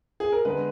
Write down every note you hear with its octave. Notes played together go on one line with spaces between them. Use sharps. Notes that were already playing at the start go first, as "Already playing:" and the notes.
G#4
A#4
D3 G#3 B3 B4